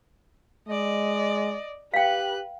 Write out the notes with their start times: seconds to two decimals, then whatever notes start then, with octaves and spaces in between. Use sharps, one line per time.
0.68 G#3 D5 D#5
1.94 G4 B4 F5 G5 F#6